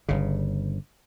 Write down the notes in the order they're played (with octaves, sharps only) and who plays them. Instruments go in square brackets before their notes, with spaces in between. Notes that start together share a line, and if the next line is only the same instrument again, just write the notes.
[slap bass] G1 C#3